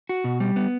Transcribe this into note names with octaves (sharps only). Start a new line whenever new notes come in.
F#4
B2
G3
B3